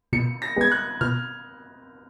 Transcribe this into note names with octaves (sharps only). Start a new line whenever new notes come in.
B2 C#7
A#6
G#3 B3 G#6
F#6
B2 F6